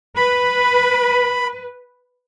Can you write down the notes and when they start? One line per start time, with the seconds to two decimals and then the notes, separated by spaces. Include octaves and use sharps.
0.16 B4 B5